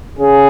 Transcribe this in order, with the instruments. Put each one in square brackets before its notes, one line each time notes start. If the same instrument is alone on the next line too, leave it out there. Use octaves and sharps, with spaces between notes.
[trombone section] C#3 G#4